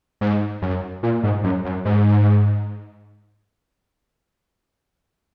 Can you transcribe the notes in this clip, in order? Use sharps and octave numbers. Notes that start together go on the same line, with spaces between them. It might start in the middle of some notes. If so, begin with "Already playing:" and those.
G#2
F#2
A#2
G#2
F#2
F#2
G#2